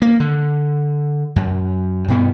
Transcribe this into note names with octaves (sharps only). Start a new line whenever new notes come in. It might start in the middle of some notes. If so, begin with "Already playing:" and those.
A#3
D3
F#2
G2 B2 B3